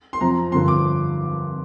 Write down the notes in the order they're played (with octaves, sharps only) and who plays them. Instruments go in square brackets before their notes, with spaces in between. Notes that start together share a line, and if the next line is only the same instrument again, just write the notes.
[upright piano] C6
F2 C3 F3 A#5
G2 D3 F3 C6
D6